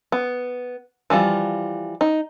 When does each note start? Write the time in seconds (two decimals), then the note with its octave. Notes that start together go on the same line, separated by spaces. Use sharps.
0.12 B3
1.10 E3 F3 G3 F4
2.01 D#4